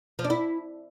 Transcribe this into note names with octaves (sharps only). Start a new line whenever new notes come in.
F3
D4
E4